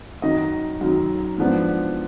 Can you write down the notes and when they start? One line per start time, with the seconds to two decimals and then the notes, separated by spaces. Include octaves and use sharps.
0.22 F#2 D#3 F#3 D#5
0.81 F#2 D#3 F#3
1.38 G#2 F3 B3 D4